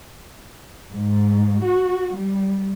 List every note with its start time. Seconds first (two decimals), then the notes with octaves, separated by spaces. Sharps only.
0.91 G#2
1.63 F#4
2.16 G3